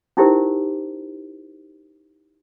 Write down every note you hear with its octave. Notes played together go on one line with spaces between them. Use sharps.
C#4 D#4 E4 G4 A#4 C5